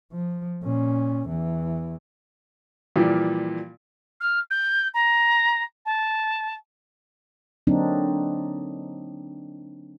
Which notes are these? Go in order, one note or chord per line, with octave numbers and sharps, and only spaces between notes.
F3
A#2 C#4
E2 E3
A#2 E3 F3 G3
F6
G6
A#5
A5
D3 F#3 A#3 C4 D4 D#4